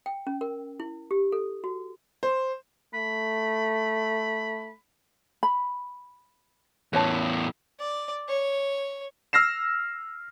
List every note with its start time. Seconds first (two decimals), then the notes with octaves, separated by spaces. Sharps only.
0.06 G5
0.27 C#4
0.41 A#4
0.80 E4
1.11 G4
1.32 A4
1.64 F#4
2.23 C5
2.94 A3 B5
5.43 B5
6.93 E2 A2 B4 C#5 A5
7.80 D5
8.29 C#5
9.33 E6 F6 A#6 C7 E7